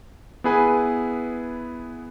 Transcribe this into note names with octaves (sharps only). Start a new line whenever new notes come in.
B3 E4 G#4 B4 G#5